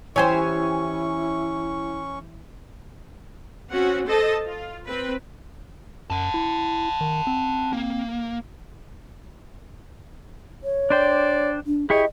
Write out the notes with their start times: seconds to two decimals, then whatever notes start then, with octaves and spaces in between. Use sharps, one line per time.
0.16 E3 C#4 E4 G4 C5 C#5 G#5 C#6
3.72 C4 C#4 F#4 F#5
4.08 A4 C5 D#5 A5
4.47 F4
4.86 C4 B4
6.10 F#2 F#5 A5
6.34 E4
7.01 D#3
7.27 C4
7.73 A#3
10.64 C#5
10.90 D4 C5 D5 G5
11.67 D4
11.90 E4 G4 G#4 C#5 D#5